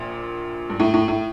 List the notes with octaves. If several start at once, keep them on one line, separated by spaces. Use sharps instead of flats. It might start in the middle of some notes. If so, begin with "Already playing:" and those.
Already playing: A#1 A#2
G2
A2
A2
A2